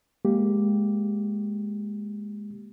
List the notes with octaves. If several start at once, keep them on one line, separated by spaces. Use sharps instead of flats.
G#3 A#3 G4